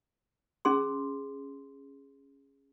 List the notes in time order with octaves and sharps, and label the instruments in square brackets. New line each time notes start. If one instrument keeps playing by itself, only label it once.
[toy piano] C#4 G#4 C6